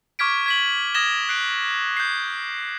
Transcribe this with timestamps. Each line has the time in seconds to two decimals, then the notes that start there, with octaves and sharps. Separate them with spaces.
0.19 C#6 D6 F6 G#6 B6 D7
0.46 G#6 B6 F#7
0.94 D#6 G#6 A#6 E7 G7
1.29 F#6 C7 D7
1.97 G6 C7